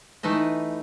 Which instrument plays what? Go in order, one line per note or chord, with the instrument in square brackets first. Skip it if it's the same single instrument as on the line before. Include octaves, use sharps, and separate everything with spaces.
[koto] E3 A3 D#4 B4 D#5